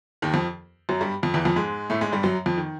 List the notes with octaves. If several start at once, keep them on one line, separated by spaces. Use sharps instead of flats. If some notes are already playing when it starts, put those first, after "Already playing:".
D#2 D#3
F2 F3
F#2 F#3
G2 G3
F2 F3
E2 E3
F2 F3
G#2 G#3
A2 A3
G#2 G#3
G2 G3
F#2 F#3
F2 F3
D#3